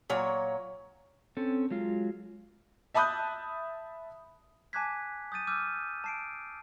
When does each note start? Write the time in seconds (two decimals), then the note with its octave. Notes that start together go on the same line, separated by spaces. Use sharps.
0.10 A#2 F#3 C#5
1.37 C4 C#4 A4
1.71 F#3 G#3 F4
2.94 E5 A5 B5 D#6 F#6 G6
4.73 G#5 A5 D6 F#6 G#6 B6
5.32 D#6 G6 A6 D#7
5.47 D6 E6 F6 G6 D#7
6.04 A5 C7 D7